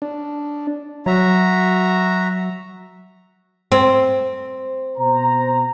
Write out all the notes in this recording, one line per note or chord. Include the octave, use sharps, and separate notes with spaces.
D4
F#3 F#4 E5 A#5
C4
B2 C5 A#5